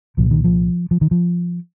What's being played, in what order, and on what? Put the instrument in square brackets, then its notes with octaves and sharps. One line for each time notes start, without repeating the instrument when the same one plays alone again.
[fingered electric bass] C2 A#2 F3
D#3
F3
F3
D#3
F3